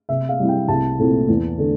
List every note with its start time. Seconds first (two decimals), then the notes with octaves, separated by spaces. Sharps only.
0.09 C3 E5
0.29 F5
0.39 G3 C4 E4
0.49 G5
0.68 C2 A5
0.99 A#2 A3 C4 E4
1.28 E2
1.58 D3 A3 D4